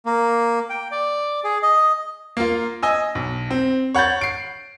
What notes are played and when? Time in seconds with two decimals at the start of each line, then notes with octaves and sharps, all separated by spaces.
0.06 A#3
0.70 G5
0.91 D5
1.44 G#4
1.63 D#5
2.37 A#3 F4
2.83 D#5 G#5 E6
3.15 B1
3.51 C4
3.95 C#5 F#5 B5 G6 A6
4.21 C7 D7